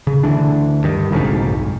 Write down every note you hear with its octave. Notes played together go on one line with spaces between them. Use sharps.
C#3
D2 D3 E3 D4
G2 D#3
F#1 B1 F2 G#2